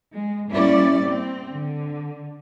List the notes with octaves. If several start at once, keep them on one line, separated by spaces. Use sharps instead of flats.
G#3
G3 A#3 C#4 E4 D5
C4
D3